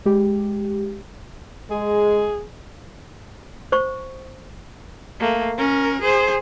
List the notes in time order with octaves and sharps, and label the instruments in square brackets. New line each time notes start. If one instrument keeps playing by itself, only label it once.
[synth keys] G#3 G4
[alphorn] G#3 [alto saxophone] G#4
[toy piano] C5 C#6
[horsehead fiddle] A3 A#3
C#4 A#4
G#4 C5